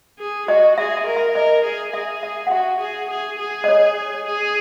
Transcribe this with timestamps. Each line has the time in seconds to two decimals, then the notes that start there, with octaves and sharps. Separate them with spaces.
0.19 G#4
0.48 F#4 D#5
0.78 G#4 E5
0.97 E5
1.06 A#4
1.16 E5
1.35 A#4 D#5
1.65 G#4
1.93 G#4 E5
2.23 E5
2.47 F#5
2.51 F#4 E5
2.81 G#4
3.10 G#4
3.39 G#4
3.64 D#5
3.68 C#5
4.27 G#4